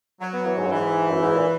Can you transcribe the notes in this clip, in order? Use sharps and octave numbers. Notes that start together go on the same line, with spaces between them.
F#3
B3
E3
G#2
F#2
G#2 E3
F#2
G#2
A#2